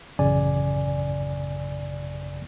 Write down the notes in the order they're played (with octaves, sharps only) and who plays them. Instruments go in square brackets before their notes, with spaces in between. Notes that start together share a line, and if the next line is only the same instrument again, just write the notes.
[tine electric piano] A1 F#2 C#3 D5 G#5